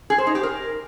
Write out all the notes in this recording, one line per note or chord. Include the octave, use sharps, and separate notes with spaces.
G#4
C5
D#4
G4
A#4